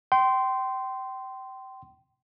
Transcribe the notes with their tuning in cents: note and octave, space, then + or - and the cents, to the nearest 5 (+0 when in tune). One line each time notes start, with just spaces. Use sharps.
G5 -25 C6 -10